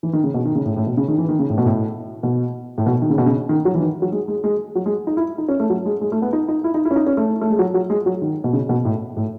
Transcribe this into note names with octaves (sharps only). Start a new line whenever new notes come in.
E3
D#3
C#3
B2
D#3
C#3
A2
A2
B2
C#3
D#3
E3
D#3
C#3
A2
B2
A2
B2
A2
B2
D#3
C#3
B2
C#3
D#3
F#3
E3
D#3
F#3
G#3
G#3
G#3
F#3
G#3
D#4
E4
D#4
C#4
A3
F#3
G#3
G#3
A3
B3
D#4
D#4
E4
D#4
E4
C#4
D#4
C#4
A3
A3
G#3
F#3
F#3
G#3
F#3
D#3
B2
C#3
B2
A2
A2